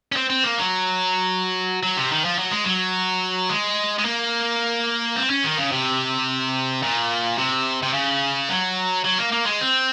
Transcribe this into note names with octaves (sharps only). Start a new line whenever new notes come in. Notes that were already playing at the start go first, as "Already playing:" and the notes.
C#4
C4
C4
A#3
F#3
F#3
C3
D#3
F3
F#3
G#3
F#3
G#3
G#3
A#3
C4
C#4
D#3
C#3
C3
A#2
C3
C3
C#3
F#3
F#3
A#3
A#3
G#3
C4